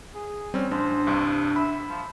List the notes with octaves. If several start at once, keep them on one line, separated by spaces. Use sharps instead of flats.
G#4
G3 C4 C#4
A1 D4 C5
C2 G2
E5 B5
F3